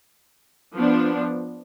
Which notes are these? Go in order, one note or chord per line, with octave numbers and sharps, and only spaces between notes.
F3 B3 D4